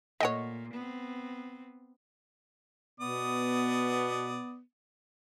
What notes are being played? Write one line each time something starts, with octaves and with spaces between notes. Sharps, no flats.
A#2 A3 C#5 D#5 F#5
B3 C4
B2 B3 D5 D#6